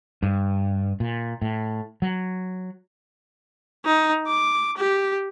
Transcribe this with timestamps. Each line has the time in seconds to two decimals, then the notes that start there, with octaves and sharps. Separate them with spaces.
0.23 G2
1.00 A#2
1.42 A2
2.02 F#3
3.85 D#4
4.27 D6
4.77 G4